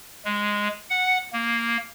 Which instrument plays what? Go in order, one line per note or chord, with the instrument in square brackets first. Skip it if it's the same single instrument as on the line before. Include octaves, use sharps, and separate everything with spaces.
[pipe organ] G#3
F#5
A#3